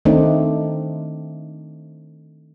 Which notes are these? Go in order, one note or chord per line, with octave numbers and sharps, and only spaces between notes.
D#3 A3 C4 D4 D#4